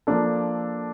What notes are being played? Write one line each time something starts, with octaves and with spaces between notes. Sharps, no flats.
F3 A#3 D4 A4